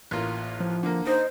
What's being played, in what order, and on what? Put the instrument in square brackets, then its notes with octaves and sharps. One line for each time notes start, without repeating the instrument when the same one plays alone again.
[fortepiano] A1 A#3 F4
[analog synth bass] F3
[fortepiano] D3 A#3
[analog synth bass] D#4 [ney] C5